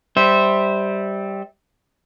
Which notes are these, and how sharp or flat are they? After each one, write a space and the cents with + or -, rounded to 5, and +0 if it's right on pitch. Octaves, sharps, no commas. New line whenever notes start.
G3 +0 C5 +0 E5 -15